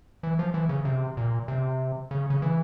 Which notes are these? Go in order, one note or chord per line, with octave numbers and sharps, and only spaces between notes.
E3
F3
E3
C#3
C3
A#2
C3
C#3
C#3
E3